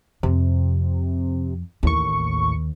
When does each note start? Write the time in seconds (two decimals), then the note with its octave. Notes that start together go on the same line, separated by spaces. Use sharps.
0.23 F2 C3
1.83 A1 D#2 A2 C#6